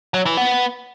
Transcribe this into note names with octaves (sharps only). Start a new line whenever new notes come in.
F#3
E3
B3